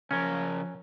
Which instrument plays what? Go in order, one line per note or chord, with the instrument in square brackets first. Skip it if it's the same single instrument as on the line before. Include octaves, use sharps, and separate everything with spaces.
[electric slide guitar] C#3 A#4 [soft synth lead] F3 [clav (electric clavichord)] C#4